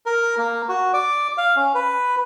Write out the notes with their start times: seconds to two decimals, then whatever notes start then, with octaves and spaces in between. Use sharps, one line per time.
0.06 A#4
0.38 A#3
0.69 F#4
0.94 D5
1.38 F5
1.56 C#4
1.75 B4